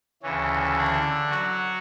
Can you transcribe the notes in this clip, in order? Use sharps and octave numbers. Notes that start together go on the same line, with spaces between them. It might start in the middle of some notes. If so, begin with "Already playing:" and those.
D2 C#3 E3 C#4
D3 D4
F#3 F#4